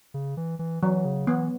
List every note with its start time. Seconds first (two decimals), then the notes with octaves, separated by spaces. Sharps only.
0.14 C#3
0.37 E3
0.59 E3
0.83 E3 F#3
1.05 C#3
1.27 E3 B3